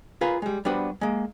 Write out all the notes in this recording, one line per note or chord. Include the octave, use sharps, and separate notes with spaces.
F4 G#4 A#4 B4 F5
G3 G#3
G3 B3 D4 F#4 B4 C5
G#3 A#3